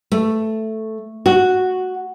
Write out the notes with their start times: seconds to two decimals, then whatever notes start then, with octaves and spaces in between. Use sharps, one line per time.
0.12 A3
1.26 F#4